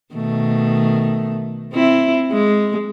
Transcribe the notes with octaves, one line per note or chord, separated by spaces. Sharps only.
B2 D#3 A3
C4 E4
G#3